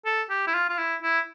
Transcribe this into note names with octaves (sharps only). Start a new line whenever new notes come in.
A4
G4
E4
F4
F4
E4
E4